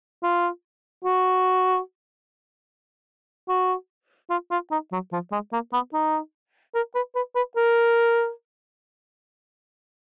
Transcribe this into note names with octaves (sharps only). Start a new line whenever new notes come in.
F4
F#4
F#4
F4
F4
D#4
F#3
F3
G#3
A#3
B3
D#4
A#4
B4
B4
B4
A#4